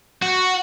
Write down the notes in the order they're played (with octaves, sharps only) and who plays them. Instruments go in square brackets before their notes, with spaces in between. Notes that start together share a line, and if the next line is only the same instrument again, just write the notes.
[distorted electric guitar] F#4